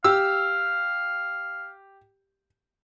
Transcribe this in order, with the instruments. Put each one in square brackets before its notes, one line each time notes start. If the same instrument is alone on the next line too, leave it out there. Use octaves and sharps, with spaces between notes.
[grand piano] G4 [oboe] F5 [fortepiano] E6